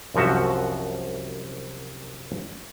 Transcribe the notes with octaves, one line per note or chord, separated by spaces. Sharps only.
C2 F#2 F3 F#4 E5